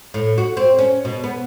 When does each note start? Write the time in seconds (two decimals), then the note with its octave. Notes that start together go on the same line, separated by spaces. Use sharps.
0.14 A2
0.38 F#4
0.57 C4
0.79 C#4
1.05 B2
1.24 B3